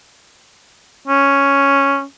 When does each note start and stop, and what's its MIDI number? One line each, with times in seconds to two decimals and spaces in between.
1.08 2.03 61